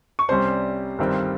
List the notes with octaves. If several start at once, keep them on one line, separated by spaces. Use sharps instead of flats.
C#6
C2 C3 G3 C#4 C5 C6
G1 G2 D#3 G3 C4